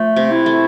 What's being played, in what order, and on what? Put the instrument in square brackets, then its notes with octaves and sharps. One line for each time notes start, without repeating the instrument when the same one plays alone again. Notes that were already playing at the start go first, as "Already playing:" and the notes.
Already playing: [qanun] F3 [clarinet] A3
[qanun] C3
[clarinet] E4
[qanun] A3